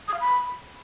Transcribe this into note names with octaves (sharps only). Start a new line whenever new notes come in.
D#6
F5
B5